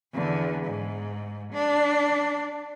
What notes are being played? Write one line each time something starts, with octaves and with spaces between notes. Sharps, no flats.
E2 D3
G#2
D4